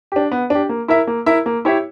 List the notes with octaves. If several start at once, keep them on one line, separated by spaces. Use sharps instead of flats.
D4 G4
B3
D4 G4
A#3
E4 A#4 E5
A#3
E4 A#4 E5
A#3
E4 G4 C#5 E5